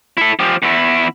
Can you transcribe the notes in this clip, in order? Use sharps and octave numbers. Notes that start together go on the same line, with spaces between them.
E4 A4
F3 G4
E2 E4